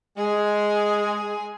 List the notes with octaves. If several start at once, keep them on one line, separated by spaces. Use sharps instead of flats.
G#3 G#4 G#5